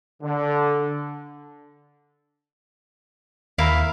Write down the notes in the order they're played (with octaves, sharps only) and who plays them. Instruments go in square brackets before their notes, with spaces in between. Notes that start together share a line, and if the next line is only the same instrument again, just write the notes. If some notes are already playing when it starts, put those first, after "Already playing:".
[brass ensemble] D3
[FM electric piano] D#2 [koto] E4 A#4 F5